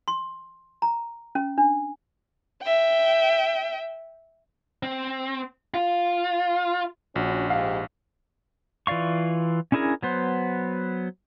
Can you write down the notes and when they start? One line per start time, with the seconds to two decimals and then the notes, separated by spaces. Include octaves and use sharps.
0.08 C6
0.82 A#5
1.35 C#4
1.58 D4
2.62 E5 G5
4.83 C4
5.74 F4
7.16 A#1 C#4 D4 F#4
7.50 G#2 G4 F5
8.87 E3 F4 D5 F5 C#6
9.72 C#4 D4 E4 G#4 A#4
10.03 F#3 B3 C5